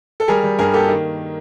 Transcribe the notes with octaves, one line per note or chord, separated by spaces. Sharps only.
A4
G3 G#4 A#4
G3
G2 G#4 A#4
A#3 G4 A4
D#3